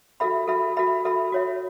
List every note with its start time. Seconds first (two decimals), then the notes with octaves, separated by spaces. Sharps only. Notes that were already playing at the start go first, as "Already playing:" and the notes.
0.20 F#4 A4 E5 B5
0.48 F#4 A4 E5 B5
0.77 F#4 A4 E5 B5
1.05 F#4 A4 E5 B5
1.32 F#4 C#5 E5